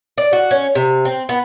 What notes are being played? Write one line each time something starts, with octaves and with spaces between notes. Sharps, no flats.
D5
F#4
C#4
C3
C4
B3